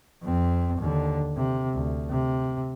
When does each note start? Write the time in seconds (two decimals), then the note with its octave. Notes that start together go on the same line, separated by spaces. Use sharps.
0.23 F2 C4
0.78 D#2 D3
1.37 C3
1.74 D2
2.10 C3